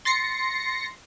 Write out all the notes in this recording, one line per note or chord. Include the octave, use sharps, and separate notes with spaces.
C6 A6 A#6 C7 C#7